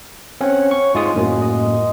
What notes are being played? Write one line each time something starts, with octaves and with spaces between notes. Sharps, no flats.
C4 C#4 C#5 F#5
C#6
G#2 G#3 F4 G#4 D#6
F#2 A2 A#3 F#4
D#5